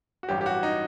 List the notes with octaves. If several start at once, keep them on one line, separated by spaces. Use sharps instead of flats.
F#4
A1 G2 F#3 G4
G4
F#4
D#4